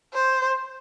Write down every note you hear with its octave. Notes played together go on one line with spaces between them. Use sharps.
C5